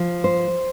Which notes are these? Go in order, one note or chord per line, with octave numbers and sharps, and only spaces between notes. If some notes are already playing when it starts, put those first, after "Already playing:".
Already playing: F3
C5